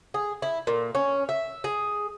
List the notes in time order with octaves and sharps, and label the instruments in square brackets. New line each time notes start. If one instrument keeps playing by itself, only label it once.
[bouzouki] G#4
E4
A#2
C#4
E5
G#4